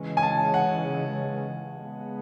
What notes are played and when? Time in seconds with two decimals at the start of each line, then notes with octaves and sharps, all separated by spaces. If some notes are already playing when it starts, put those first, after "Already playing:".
Already playing: C#3 E3 G#3 C#4
0.17 G#5
0.23 A5
0.54 F#5
1.76 C#3 G#3 B3